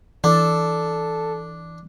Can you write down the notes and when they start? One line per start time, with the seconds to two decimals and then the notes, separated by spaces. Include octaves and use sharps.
0.24 E3 D4 A4